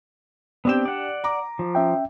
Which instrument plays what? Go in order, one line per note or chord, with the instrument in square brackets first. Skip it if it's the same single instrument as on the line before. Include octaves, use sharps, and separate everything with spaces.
[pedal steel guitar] B3 C4 G5 [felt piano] D4 G4 E7
[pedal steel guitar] D5 F#5
[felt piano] A#5 D6
[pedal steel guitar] F3
[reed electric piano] C#4 E5 G5